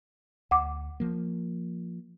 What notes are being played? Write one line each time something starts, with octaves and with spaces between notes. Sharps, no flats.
D2 F#5 D6
F3 A#3